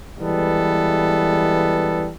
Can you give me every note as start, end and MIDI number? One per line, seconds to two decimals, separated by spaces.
0.20 2.09 52
0.20 2.09 55
0.20 2.09 56
0.20 2.09 59
0.20 2.09 69